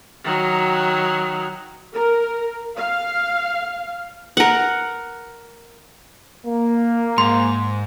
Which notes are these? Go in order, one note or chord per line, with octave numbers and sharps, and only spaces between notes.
D#3 F#3
A#4
F5
A#4 F#5
A#3
G#2 C6